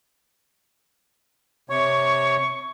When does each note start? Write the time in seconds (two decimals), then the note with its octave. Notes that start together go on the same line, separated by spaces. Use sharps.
1.70 C3 C#5 C#6